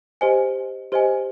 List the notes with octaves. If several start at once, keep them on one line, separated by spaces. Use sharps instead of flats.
G4 C5 D#5 G#5
G4 C5 D#5 G#5